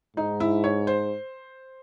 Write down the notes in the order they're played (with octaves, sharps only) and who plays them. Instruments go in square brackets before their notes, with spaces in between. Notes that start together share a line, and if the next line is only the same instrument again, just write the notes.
[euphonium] G#2 [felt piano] D#4
[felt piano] E4
C#5
C5